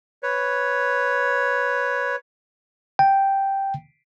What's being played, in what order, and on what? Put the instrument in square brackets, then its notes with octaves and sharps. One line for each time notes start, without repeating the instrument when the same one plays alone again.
[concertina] B4 C#5
[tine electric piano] G5